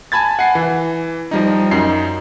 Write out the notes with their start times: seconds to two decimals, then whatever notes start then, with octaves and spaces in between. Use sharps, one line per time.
0.12 G#5 A5 B5 G#6 A6
0.39 F#5 G#5 C7
0.55 E3
1.31 F3 G3 D#4
1.71 F#2 D#4 C7